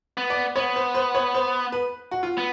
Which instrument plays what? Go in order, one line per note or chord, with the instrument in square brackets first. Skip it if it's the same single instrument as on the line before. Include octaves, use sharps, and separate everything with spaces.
[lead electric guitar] B3
[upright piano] D5
[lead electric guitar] B3 [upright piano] C#5
[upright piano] C5
C5
C#5
C5
B4
F#4
F4
[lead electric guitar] B3